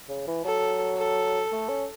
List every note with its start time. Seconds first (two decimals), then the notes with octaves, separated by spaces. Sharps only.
0.09 C#3
0.27 E3
0.45 F#3 A4
0.97 A4
1.52 A3
1.69 C#4